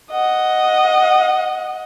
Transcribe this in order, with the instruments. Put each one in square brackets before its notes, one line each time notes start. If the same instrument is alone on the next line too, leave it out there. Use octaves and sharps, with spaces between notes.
[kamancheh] D#5 F#5